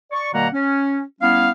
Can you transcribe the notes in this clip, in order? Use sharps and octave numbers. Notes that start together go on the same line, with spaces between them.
D5 C#6
B2 D#3 G3 A#3 F#5 A#5
C#4
G3 B3 C#4 E4 F5